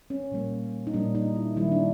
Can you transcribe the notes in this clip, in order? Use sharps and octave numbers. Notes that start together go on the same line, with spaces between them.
C#4
A#2 G3 A#3
D#4
A#2 G3 A#3 D4
D#4
E4
D#3 G3 A#3 E4
D4